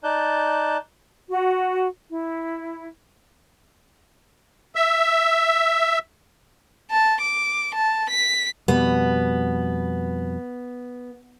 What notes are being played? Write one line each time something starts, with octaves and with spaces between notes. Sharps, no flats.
D#4 D5 A5 F#6 G6
F#4
E4
E5
A5
D6
A5
B6
F2 B2 G3 B3